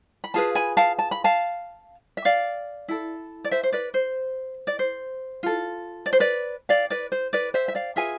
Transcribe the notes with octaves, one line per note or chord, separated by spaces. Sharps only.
B5
F4 G#4 B4 F5 A5
G#5 B5
F5 A5
A5
B5
F5 A5
E5
D5 F5
E4 A4
D5
C5 E5
C5
B4 D5
C5
D5
C5
F4 A4
D5
C5
B4 D5
D5 F5
B4 D5
C5
B4 D5
C5 E5
E5
D5 F5
F4 G#4 B4 E5 G#5